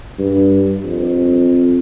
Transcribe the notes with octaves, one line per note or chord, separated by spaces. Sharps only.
G2
F2